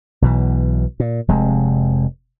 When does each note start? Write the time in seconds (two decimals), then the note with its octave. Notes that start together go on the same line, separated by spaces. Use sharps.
0.22 B1 B2 E3
1.00 A#2
1.28 F1 C3 G#3